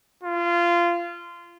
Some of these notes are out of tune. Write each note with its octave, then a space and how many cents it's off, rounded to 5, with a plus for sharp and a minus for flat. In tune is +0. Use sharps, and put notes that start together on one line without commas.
F4 -20